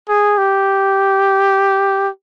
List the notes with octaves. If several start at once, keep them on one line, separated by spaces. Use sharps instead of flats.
G#4
G4